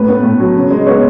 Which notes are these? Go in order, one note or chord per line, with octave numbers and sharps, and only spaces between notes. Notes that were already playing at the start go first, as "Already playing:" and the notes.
Already playing: A2 A3 B4
B3
A2
F#3
C#3
G#3
B3 C#5